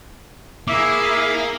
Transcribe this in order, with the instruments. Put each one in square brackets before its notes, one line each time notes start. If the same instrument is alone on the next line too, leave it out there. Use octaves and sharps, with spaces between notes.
[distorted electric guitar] A#3 [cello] E4 G#4 [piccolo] E5 [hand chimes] D6